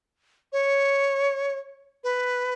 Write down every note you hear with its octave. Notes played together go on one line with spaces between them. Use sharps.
C#5
B4